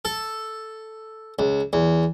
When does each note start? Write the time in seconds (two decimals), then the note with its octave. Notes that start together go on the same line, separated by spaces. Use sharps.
0.05 A4
1.39 C#2
1.73 E2